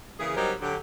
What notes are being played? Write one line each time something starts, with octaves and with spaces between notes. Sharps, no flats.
C#3 E3 A#3 G#4
F#3 G3 C4 D#4 G4 A#4
D3 F#3 G4